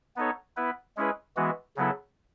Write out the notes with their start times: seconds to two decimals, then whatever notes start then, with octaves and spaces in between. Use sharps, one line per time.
0.16 B3 D#4 A4 C#5
0.56 B3 E4 B4
0.97 G#3 C#4 E4 G#4 B4
1.36 E3 G#3 B3 F#4
1.77 C#3 F#3 B3 E4 A4